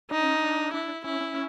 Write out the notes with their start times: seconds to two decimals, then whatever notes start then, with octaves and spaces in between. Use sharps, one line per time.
0.11 D4 D#4
0.23 C#4
0.36 D4
0.73 D4 E4
1.04 C#4 E4
1.21 C#4